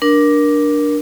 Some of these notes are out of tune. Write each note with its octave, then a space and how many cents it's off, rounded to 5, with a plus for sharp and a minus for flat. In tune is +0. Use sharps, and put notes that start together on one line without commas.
D4 +0 A#4 +20